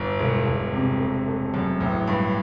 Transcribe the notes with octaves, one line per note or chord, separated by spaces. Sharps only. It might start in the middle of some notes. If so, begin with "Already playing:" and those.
Already playing: G1
E1
E1
C3
A3
A3
F#2
A1
G2